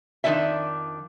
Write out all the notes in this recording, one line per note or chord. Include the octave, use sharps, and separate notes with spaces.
F2 D#3 A#3 D4 D5 E5